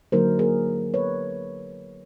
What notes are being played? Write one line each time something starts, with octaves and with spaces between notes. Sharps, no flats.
D3 F#3 A#3 D#4 A#4 C5
G#4 A#4
B4 C#5